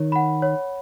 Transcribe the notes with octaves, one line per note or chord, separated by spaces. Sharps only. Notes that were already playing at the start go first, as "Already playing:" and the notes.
Already playing: D#3 C#5
F#5 B5
C#5